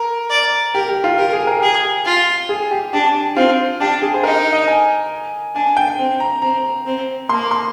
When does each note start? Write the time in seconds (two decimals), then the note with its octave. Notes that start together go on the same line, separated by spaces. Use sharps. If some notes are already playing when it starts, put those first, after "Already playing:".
Already playing: A#4
0.31 D5
0.74 G4 A#4
0.88 G4
1.04 F4
1.18 G4 A#4
1.33 G#4
1.47 A#4
1.62 G4 G#4
2.05 F4
2.49 G#4
2.71 G4
2.93 D4 G4
3.36 C4 F4
3.80 D4 G4
4.02 G#4
4.14 C5
4.23 D#4 A#4
4.53 D#5
4.68 G#5
5.55 D4 G#5
5.77 G5
5.99 C4
6.20 A#5
6.42 C4 A#5
6.86 C4
7.29 A#3 C6
7.51 C6